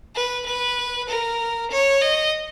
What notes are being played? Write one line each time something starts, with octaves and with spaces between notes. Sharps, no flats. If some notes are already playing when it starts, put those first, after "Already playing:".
B4
B4
A#4
C#5
D#5